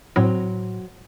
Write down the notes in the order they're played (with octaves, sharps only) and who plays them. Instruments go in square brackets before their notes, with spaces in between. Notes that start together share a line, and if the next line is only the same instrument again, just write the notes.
[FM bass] A2 [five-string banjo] F#3 C4